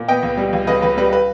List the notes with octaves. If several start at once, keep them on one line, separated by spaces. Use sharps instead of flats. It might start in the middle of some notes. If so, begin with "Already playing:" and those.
Already playing: A#2
B3 D#5 G5
C#2
G3
C#2
C#3 B4 D#5
C#2 B4
G3 B4
B4